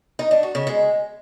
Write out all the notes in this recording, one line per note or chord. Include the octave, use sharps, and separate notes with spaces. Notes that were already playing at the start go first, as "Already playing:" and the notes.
D#4
D4
F#4
C#3
G#3